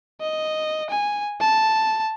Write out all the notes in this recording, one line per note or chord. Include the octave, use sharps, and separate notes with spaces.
D#5
G#5
A5